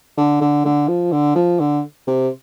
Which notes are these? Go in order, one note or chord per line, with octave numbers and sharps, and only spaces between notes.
D3
D3
D3
F3
D3
F3
D3
C3